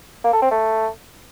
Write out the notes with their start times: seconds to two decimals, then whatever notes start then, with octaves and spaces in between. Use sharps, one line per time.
0.24 A#3
0.33 A4
0.42 C4
0.51 A3